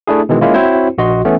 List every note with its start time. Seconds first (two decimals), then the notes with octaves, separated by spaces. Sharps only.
0.07 A3 D4 E4 G#4
0.29 B2 D#3 E3 G#3
0.41 G#3 A#3 C#4 E4 F4
0.54 C4 E4 F#4 C5 C#5
0.98 A#1 F#4 D#5 C6
1.25 E3 A3 B3 C#4